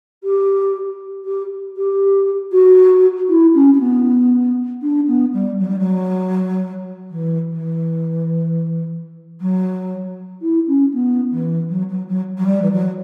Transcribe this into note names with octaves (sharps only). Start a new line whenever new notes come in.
G4
G4
G4
F#4
E4
C#4
C#4
B3
D4
B3
G3
F#3
G3
F#3
E3
E3
F#3
E4
C#4
B3
E3
F#3
F#3
F#3
F#3
G3
E3
F#3